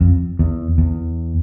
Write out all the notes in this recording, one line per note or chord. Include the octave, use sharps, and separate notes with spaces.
F2
E2
E2